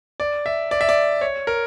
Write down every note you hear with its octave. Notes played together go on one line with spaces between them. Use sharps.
D5
E5
D5
E5
D5
C#5
A#4